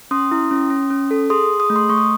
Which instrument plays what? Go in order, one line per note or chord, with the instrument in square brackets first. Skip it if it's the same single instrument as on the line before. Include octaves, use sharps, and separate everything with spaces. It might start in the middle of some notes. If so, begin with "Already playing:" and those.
[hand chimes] C#4 C6 D#6
E4
C#4
C#4
C#4
A4
G#4 C6 D#6
G#4
D#6
A3
C6 D#6
A3 C#6
D#6